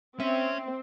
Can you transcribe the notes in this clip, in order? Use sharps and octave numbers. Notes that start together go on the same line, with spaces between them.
C4 C#4 E5